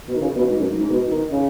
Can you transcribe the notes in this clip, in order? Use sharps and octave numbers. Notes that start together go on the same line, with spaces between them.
B2
D#3
C#3
B2
G#2
F#2
G#2
G#2
B2
D#3
C#3